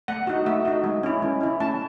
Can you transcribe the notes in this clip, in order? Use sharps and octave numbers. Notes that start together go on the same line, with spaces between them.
A3 F#5
D#4 F#4
A3 E5
D#4 F#4
G#3
C#4 E4
G#3
C#4 E4
A3 A5